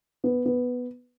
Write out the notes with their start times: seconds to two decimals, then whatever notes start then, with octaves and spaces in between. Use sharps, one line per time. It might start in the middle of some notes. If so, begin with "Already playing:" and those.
0.24 B3
0.45 B3